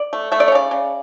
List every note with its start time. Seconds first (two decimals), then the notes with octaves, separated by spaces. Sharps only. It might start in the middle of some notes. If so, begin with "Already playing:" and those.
Already playing: D5
0.13 A3
0.32 A3 E5
0.40 D5
0.48 C#5
0.52 C#3 D5
0.71 C#3